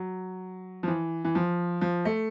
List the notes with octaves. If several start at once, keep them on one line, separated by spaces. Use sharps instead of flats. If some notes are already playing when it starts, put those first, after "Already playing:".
Already playing: F#3
F3
E3
E3
F3
F3
A3